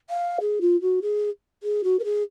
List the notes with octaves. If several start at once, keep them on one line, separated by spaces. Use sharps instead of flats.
F5
G#4
F4
F#4
G#4
G#4
F#4
A#4
G#4